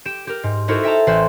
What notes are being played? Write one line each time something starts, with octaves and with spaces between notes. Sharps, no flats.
G4 D7 E7
G4 A#4
G#2
D#4 E4 F#4 A4 A#4 C5
E5 G5 A5 A#5
A1 F4 B4 C5